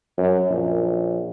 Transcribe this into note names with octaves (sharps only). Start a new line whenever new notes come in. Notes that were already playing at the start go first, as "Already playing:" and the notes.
F#2
A#1